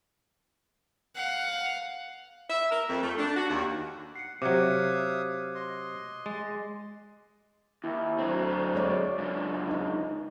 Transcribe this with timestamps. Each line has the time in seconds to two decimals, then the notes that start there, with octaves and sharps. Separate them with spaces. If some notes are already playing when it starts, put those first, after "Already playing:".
1.15 F5 F#5
2.50 E5
2.71 A#4
2.89 F2
3.02 A3
3.18 D4
3.37 F#4
3.49 D#2
4.16 F#5 C7 C#7
4.42 C3 F#3 E5 F5 D6 D#6 F#6 G#6
5.55 D#5 C6
6.26 G#3 A6
7.84 D#2 E4
8.19 D2 F#3 C4
8.75 G#3 C#5 D5
9.18 C#2 F#2 D3
9.71 D#4